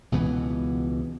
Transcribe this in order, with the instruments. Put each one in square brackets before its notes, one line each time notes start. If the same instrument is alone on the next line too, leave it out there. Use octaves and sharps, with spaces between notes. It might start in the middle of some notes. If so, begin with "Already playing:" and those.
[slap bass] C#2 B2 E3 B3